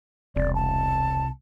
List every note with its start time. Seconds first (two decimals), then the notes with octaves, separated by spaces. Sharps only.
0.36 E1 C2 C4 D5
0.55 A5